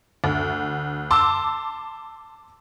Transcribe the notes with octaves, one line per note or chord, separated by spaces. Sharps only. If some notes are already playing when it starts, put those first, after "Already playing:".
D2
A5 C6 D6 E6